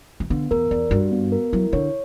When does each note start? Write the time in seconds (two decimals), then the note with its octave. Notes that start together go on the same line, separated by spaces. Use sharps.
0.20 E3
0.30 D3 B3
0.51 E2 A#4
0.71 E2 D5
0.91 G2 F#4
1.12 B3
1.32 A#4
1.52 F#3 E4
1.73 D3 C#5